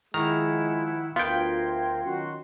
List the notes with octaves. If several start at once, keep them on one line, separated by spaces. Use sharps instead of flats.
D#3 F3 G#3 E4 F#5 A#5
D2 B3 F4 A#4 G5 C6 G#6
D#3 F#3 C#4 F#4 F#5 C6